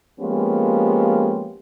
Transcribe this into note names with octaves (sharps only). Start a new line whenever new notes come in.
F3 G#3 A#3 B3 C#4 G4